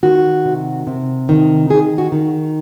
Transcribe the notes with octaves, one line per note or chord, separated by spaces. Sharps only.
D#3 F#4
C3
C3
D#3
D#3 G#4
F#4
D#3